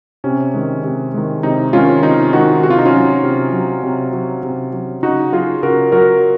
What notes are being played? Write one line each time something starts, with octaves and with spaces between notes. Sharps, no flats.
C3 C#4
D#3 G#3
C3
D#3 G#3
C3 D#4
D#3 G#3 C#4 F4
C3 D#4
D#3 G#3 D#4 F#4
C3 F#4
F4
D#4
C#4 F4
F#3
C3
F#3
C3
F#3
C3
F#3
C#3 D#4 F#4
F#3 F4 G#4
C#3 F#4 A#4
F#3 F#4 A#4